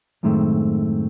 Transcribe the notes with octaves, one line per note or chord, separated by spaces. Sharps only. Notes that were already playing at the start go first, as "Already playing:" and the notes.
F#2 A2 D#3 G#3 A3 C4